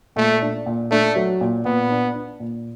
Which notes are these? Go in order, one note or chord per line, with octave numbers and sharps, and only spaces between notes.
A#2 A3
D4
A#2
A3 D4
F#3
A#2
A#2 B3
D4
D4
A#2